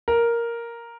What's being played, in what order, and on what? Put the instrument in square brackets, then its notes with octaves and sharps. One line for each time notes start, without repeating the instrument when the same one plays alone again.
[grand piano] A#4